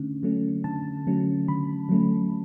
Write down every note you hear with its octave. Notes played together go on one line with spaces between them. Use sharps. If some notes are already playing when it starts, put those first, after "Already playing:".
Already playing: D3 A3 C#4
F#3 A3 C#4
D3 A5
F#3 A3 C#4
D3 B5
F#3 A3 C#4